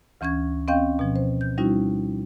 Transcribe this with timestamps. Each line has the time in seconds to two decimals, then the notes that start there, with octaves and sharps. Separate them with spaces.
0.21 D2 E3 C#4 C#6 G#6
0.68 C4 C#4 D#5 F5 G5 G6
0.99 B2 F3
1.16 C5
1.41 G6
1.58 G3 C#4 D#4 E4 F#4